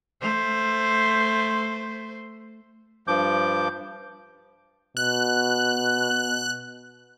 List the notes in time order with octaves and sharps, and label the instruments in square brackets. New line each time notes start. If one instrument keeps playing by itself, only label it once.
[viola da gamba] A3 C5
[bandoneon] G2 F3 D6 G6
[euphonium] B2 [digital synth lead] F#6